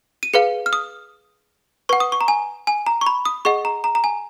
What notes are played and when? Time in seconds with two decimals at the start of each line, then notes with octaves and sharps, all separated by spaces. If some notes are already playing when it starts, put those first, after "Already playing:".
0.23 D#7
0.34 G#4 B4 F5 C#7
0.66 F6
0.73 D#6
1.89 B4 F#5 C#6
2.00 D#6
2.12 C#6
2.21 A#5
2.28 G#5
2.67 G#5
2.87 A#5
3.01 C#6
3.07 B5
3.25 D#6
3.45 G#4 D#5 F#5 C#6
3.65 A#5
3.84 A#5
3.95 A#5
4.04 G#5